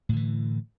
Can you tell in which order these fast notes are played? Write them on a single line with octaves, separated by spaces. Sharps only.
A2 D3 E3